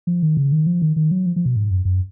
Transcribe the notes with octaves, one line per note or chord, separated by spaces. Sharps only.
F3
D#3
C#3
D#3
F3
D#3
D#3
F#3
F3
F3
B2
G#2
F#2
F#2